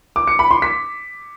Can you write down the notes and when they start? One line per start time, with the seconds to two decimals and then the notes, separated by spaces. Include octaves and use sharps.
0.16 D6
0.28 C#7
0.39 B5
0.51 C6
0.62 B6